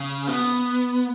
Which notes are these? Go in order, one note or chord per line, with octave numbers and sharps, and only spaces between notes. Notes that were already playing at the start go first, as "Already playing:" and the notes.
Already playing: C#3
B3